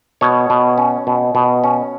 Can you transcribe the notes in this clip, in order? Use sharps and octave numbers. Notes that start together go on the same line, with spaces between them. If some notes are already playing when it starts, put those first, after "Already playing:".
B2 C#5
B2
C#4
B2
B2
C#4